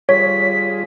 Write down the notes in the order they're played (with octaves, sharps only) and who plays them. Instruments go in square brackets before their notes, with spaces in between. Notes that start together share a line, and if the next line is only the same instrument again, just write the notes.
[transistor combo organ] G3 F4 G#4 [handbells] C#5 [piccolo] B6